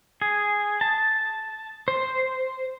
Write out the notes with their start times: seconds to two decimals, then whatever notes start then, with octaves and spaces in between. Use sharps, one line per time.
0.22 G#4
0.81 A5
1.88 C5